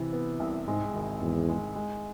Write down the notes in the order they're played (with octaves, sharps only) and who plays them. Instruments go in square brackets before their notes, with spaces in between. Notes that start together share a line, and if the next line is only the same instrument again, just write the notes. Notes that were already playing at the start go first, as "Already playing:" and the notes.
Already playing: [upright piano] C3 E3
B3
C2
[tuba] G#2 [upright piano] G#3
[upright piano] G#1
[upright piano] G#1 [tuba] E2
[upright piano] G#3
G#3